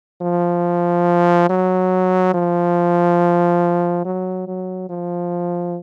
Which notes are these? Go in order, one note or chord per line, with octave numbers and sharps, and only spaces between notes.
F3
F#3
F3
F#3
F#3
F3